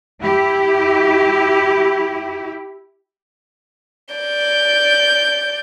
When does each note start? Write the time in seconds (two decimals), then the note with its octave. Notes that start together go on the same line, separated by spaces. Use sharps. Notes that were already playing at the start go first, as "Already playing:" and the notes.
0.21 E4 G4
4.14 D5 G6